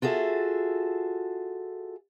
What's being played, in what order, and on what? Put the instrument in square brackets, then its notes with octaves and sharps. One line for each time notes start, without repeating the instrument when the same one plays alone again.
[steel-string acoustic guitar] F4 F#4 G#4 A4 E5